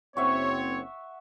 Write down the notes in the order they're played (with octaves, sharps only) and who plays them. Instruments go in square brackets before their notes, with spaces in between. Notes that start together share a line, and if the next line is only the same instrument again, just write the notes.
[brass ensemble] F#1 C4 C#5 [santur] E5 F#5 C#6